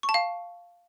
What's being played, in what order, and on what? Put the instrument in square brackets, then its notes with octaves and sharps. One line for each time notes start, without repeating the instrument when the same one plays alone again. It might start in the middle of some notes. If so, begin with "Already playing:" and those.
[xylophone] C#6
A5
F5